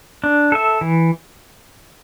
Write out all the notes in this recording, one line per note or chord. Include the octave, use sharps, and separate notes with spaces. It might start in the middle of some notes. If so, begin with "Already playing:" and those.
D4
A4 E5
E3